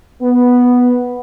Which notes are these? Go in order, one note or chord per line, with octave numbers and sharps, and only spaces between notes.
B3